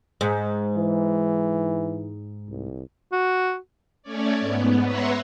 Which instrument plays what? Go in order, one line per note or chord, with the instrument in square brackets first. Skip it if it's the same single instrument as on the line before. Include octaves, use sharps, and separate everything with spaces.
[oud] G#2
[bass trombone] E3
C2
[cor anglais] F#4
[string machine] A3 C#4 C#5 D5
G#2 B3
B4 C#5 E5 F#5 A#5 C6